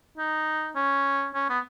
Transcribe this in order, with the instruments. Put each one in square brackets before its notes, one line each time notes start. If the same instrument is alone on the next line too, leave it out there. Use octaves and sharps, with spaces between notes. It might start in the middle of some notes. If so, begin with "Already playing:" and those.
[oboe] D#4
C#4
C#4
B3